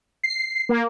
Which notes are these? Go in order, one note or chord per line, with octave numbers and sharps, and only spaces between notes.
C7
A#3